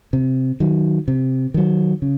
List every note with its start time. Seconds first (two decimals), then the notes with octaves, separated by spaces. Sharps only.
0.13 C3
0.60 D#3 F#3
1.08 C3
1.54 D#3 F#3
2.02 C#3